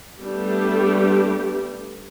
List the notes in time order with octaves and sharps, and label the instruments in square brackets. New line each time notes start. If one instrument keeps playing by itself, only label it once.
[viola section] G3 A3 B3 D4 G4